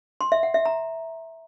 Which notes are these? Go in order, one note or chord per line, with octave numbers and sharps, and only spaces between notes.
C6
E5
F#5
E5
A#5